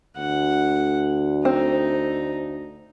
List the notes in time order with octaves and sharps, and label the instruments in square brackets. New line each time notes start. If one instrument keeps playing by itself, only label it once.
[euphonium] D2 [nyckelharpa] F#5
[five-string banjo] C4 [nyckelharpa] D#4